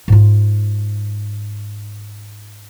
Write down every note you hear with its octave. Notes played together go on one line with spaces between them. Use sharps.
G#2 F4